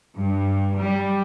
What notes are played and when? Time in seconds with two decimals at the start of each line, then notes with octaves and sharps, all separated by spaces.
0.16 G2
0.76 G3